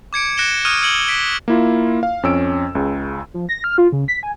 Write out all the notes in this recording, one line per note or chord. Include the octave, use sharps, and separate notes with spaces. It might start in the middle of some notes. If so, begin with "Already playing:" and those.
D6 G#6 C#7 D7
F#6 A#6 C#7 D7 E7 G7
C#6 D#6 F6 F#6 G#6 D#7
E6 G#6 C#7 D7 F#7 G7
B6 D7
A#3 E4 F4
F5
F2 C#4 E6 D7
C#2 C#3
F3
A#6
F6
F4
C#3
B6
G#5